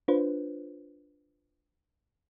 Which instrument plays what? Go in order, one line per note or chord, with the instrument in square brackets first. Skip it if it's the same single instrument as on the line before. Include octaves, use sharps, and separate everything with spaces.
[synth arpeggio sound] D4 F4 B4 C5